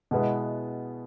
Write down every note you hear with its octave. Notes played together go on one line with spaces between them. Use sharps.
B2 G#3 B3 E4